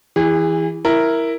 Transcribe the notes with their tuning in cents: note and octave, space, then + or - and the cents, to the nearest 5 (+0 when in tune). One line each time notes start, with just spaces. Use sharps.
E3 +0 G#4 -35
E4 +0 A#4 +0